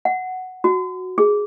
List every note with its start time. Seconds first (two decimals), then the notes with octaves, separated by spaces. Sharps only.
0.05 F#5
0.64 F#4
1.18 G#4